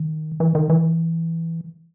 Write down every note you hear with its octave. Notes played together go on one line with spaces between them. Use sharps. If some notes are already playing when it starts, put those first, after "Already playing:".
Already playing: D#3
E3
D#3
E3